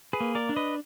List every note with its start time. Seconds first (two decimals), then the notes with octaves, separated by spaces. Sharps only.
0.13 G#4 B4
0.20 A#3
0.35 A#4 D5
0.49 D4
0.56 B4 D#5